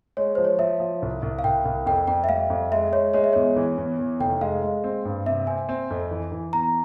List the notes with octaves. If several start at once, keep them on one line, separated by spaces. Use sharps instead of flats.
G#3 C#5
F3 C5
C#5
F3 E5
F3
C2
C2
F5
C2 G5
C2
F2 G5
F2 G5
E5
G3 F5
F2
G#3 E5
G#3 C#5
G#3 C#5
E5
E2 C#5
E3
E2
E3
F1 G5
G#3 F5
G#3
C4
G2
C3 E5
C4 G#5
C4
F2
E3
E3
E2 A#5